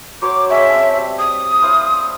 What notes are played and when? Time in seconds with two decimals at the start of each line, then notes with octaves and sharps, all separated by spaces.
0.22 F#3 C5 C#5 D6
0.50 G#3 C#4 E5 G5
0.70 C4 A5
0.98 G3
1.19 D#6
1.62 E4 C5 F5